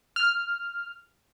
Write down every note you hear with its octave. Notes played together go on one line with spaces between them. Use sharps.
F6